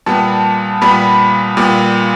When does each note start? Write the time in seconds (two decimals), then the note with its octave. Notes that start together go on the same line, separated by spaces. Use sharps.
0.06 A#2 G3 B3 A5
0.81 A#2 G3 B3 B5
1.57 A#2 G3 B3